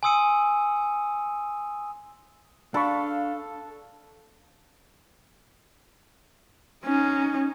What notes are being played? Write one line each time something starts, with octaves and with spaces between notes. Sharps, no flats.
G#5 C6 D#6 E6 C#7 D#7
D4 A4 F5 A5 B5 C#6
C#4 D#4